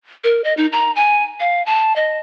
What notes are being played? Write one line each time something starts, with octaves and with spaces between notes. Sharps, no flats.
A#4
D#5
D#4
A#5
G#5
F5
A5
D#5